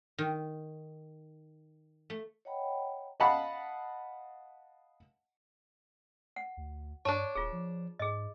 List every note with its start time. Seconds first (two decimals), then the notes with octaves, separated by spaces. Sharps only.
0.18 D#3
2.10 A3
2.45 C#5 D#5 F#5 G5 A#5 B5
3.20 D#5 F5 F#5 A5 B5
6.36 F#5
6.57 D2
7.05 G2 D4 C#5 A5 A#5
7.35 D#1 F4 G#4
7.52 F3
7.99 G#2 G#4 D#5